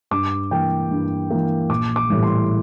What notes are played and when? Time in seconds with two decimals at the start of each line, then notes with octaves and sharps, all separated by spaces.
0.11 G2 D6
0.51 E3 A#3 G5
0.91 G2
1.30 E3 A#3
1.69 A#1 D6
1.96 D6
2.10 A2 E3 G3
2.23 C6